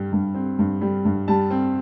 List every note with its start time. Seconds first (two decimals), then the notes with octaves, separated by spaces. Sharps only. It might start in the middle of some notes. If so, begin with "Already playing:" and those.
Already playing: G2 G3
0.13 G2
0.35 C4
0.59 G2
0.81 G3
1.05 G2
1.28 G3 A5
1.51 C4